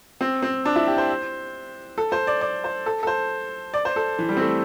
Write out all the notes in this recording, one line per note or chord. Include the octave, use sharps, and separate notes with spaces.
C4
C4
D4
E4
G4
C5
A4
C5
D5
D5
C5
A4
A4
C5
D5
C5
A4
E3
G3
C4
A3